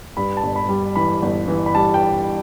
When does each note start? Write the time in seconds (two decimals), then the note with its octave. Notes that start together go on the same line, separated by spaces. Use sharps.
0.17 G2 B5
0.37 A5
0.43 G1
0.56 B5
0.69 G3
0.96 E3 B5
1.22 G1
1.48 E3
1.66 B5
1.75 G3 A5
1.94 G5